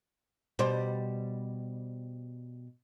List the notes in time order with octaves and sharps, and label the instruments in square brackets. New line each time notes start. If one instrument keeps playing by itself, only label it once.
[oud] B2 G3 C5